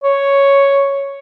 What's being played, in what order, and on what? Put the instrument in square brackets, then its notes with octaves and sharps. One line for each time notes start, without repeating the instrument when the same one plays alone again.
[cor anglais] C#5